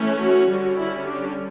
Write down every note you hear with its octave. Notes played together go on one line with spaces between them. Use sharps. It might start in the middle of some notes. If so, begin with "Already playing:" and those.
Already playing: E3 A3 C#4
F#4
D3 G3 C#4
E4
D4